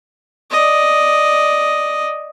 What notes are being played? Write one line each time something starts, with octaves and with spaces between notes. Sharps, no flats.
D5 D#5